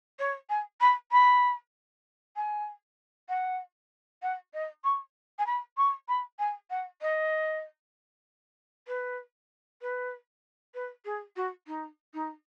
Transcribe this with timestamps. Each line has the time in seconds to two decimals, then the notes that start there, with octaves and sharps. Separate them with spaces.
0.19 C#5
0.49 G#5
0.81 B5
1.12 B5
2.36 G#5
3.29 F#5
4.22 F#5
4.53 D#5
4.84 C#6
5.39 G#5
5.46 B5
5.77 C#6
6.08 B5
6.39 G#5
6.70 F#5
7.02 D#5
8.87 B4
9.81 B4
10.74 B4
11.05 G#4
11.36 F#4
11.67 D#4
12.14 D#4